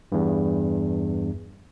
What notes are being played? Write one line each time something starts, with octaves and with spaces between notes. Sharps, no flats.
E2 G2